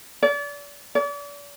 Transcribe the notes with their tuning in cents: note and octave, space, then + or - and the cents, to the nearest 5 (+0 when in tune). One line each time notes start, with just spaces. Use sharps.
D5 -35
D5 -40